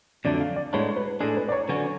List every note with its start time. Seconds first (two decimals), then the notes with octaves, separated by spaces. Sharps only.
0.25 F2 D3 F#3 A3 D4 D5
0.40 F5
0.56 D5
0.73 A2 G#3 B3 D4 C#5
0.96 B4
1.20 A2 G#3 D4 G#4 A4
1.36 B4
1.49 D5
1.52 C#5
1.68 D3 F#3 C#4 F#4 B4